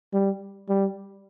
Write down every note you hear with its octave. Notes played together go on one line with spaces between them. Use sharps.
G3
G3